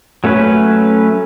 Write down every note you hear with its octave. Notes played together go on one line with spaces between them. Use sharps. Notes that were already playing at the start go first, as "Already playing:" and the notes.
F#3 A3 C#4 B4